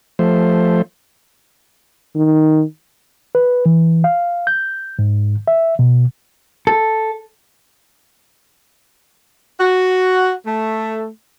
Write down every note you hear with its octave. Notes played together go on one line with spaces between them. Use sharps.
F3 A3 C5
D#3
B4
E3
F5
G6
G#2
E5
B2
A4
F#4
A3